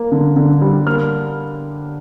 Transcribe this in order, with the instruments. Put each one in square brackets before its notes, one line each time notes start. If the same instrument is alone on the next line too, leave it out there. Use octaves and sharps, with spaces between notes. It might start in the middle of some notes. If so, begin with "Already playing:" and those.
Already playing: [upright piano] A#3
D3
D3
G3
A#3 F6